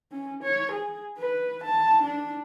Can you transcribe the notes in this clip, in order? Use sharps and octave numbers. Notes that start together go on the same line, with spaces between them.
C#4
C#5
G#4
B4
A5
D4